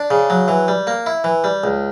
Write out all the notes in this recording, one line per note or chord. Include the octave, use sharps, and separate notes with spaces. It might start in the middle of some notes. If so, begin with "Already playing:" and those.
Already playing: D4
C#3
F#3
E3
G3
A#3
E4
E3
G3
C#2